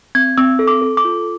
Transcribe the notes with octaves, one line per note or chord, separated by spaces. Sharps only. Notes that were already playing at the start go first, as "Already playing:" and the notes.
C4 G#6
C4 E6
A4
D6
A4
D6
F4